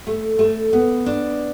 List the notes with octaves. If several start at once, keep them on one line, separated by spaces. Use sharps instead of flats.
A3
A3
B3
D4